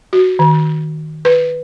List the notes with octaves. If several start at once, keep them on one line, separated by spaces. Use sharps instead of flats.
F#4
D#3
B4